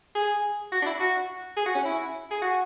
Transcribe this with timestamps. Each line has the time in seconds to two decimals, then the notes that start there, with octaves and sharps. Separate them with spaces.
0.15 G#4
0.72 F#4
0.82 D4
0.86 E4
1.00 F#4
1.56 G#4
1.66 F#4
1.75 C#4
1.85 E4
2.30 G#4
2.42 F#4